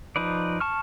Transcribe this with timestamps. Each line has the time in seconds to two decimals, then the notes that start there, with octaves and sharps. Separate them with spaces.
0.16 F3 D#4 B4 D5
0.60 A5 C#6 F6